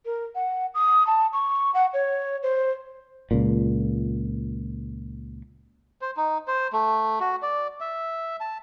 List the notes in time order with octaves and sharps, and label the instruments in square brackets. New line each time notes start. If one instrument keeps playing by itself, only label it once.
[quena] A#4
F#5
D#6
A5
C#6
F#5
C#5
C5
[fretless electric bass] C#2 A#2
[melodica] C5
D#4
C5
A3
F#4
D5
E5
A5